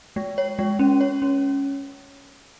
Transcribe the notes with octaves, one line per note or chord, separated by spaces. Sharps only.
G#3
C#5
G#3
C#4
C#5
C#4